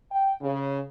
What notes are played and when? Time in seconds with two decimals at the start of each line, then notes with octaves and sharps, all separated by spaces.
0.12 G5
0.42 C#3